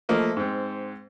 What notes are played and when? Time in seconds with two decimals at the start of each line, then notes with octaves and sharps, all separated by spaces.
0.09 F3 A3 A#3 D#5
0.37 G#2 C4